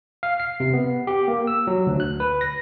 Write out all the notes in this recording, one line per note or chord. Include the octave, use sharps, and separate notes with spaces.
F5
C7
C3
B3
G4
A#3
E6
F#3
D2
F#6
B4
A#6